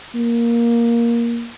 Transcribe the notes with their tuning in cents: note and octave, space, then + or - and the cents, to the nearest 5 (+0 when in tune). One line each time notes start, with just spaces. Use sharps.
A#3 +10